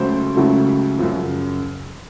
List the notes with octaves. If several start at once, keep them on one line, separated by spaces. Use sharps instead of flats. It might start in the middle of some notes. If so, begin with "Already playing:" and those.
Already playing: C#2 C#3 F#3 A3 C5
C#2 C#3 F#3 A3
F#2 C#3 F3